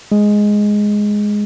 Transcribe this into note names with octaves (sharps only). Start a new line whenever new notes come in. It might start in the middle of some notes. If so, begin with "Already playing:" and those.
G#3